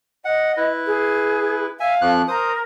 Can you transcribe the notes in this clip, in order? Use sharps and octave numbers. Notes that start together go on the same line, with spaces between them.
D#5 F#5
E4 B4
G#4
E5 F5 G#5
F2 F3 F#6
A#4 C5 D#6